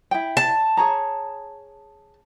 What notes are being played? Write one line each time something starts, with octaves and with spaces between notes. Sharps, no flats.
E4 G5
A5
G#4 C#5 A#5